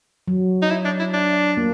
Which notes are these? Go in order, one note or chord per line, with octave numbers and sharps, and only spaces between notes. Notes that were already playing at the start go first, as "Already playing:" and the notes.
F#3
D#4
E4
D4
E4
D4
A#3